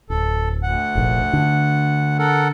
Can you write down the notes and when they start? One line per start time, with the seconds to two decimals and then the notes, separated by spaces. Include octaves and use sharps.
0.10 D1 A4
0.63 D2 F#5
0.95 F1 A#1
1.33 D3
2.19 A4 A#4 F#5